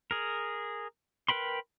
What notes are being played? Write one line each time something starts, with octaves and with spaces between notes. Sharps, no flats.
G#4 A#4
A#4 B4 G5 B5 C6